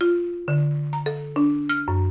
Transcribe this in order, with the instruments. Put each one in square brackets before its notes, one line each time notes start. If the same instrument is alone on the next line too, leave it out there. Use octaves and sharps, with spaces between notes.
[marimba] F4
D3
A#5
A4
D4
F6
F#2